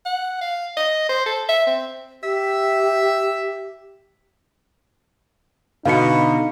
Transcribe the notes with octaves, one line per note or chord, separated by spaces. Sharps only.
F#5
F5
D#5
C5
A4
E5
C4
G4 E5
B2 D3 D#4 F5 C#7